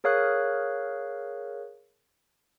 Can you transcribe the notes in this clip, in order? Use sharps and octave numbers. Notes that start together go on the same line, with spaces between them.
G#4 A#4 C#5 F5 D#6 F#6